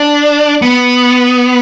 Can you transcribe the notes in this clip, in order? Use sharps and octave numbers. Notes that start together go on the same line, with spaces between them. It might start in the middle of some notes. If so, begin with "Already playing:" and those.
Already playing: D4
B3